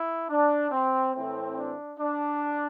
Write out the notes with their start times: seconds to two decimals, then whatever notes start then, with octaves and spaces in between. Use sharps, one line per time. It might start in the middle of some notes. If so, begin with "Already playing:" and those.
Already playing: E4
0.29 D4
0.71 C4
1.14 A2 E3 A3 C4
1.56 D4
1.99 D4